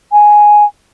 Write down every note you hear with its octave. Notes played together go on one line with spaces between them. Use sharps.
G#5